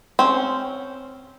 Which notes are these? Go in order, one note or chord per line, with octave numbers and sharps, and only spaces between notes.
C4 C#4